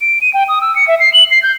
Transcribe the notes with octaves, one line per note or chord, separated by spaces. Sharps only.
D7
D#7
G5
D#6
E6
C#7
E5
C7
F#7
C7
G6